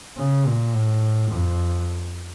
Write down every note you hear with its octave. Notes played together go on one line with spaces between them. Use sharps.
C#3
A#2
A2
F2